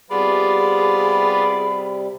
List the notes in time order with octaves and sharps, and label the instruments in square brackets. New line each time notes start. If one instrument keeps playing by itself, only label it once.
[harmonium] C3 G3 [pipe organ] B3 F4 D5 [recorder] G#4 [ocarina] B5